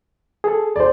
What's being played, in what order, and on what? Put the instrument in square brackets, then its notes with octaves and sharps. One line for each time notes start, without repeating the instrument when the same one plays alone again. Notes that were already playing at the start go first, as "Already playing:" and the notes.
[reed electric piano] G#4 A4
[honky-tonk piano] C5 D5